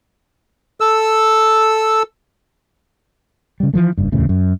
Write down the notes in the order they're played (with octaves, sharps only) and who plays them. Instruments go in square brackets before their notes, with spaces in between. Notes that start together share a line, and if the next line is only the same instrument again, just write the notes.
[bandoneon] A4 E6
[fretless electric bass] C#3 G3
E3 F3 A3
F#1 G2
D1 E2 A2 C#3
F#2